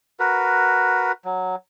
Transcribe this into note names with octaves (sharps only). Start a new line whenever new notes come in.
F#4 A#4 B4
F#3